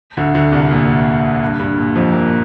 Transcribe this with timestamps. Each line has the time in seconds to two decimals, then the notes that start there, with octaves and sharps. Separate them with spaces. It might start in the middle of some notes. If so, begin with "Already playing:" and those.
0.17 D2 D3
0.35 D2 D3
0.52 C2 C3
0.71 A#2
1.42 G2
1.60 G2
1.78 A#2
1.95 F2 F3
2.13 A#2 A#3